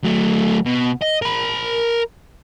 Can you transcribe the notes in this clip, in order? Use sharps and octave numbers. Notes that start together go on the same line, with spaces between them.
F#3 A3
B2
D#5
A#4 B5